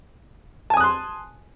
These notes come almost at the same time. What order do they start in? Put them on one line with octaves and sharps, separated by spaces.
A5 G#5 D#6 F#6 C6